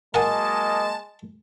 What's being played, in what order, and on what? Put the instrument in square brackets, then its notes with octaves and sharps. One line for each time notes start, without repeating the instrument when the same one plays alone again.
[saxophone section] F#3 A#3 D#5 [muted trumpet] G#3 [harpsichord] A#4 F#5 G#5 [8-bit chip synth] A5